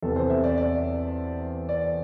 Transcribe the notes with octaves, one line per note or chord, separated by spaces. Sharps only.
E2 C3 E3 A4
C5
E5
D5
D5
D5